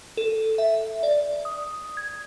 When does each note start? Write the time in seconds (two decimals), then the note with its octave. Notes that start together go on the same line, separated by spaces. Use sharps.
0.17 A4
0.58 E5
1.03 D5
1.45 D#6
1.97 G#6